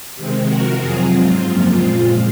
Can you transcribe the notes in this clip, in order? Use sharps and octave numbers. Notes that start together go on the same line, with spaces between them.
C3 D#3 G#3 C4
C3 F3 C4 F#4 A#4
F2 C3 F#3 F4 G#4
G#2 F#3 C4 F4
F#2 C#3 F3 A#3
A#2 F3 G#3 C4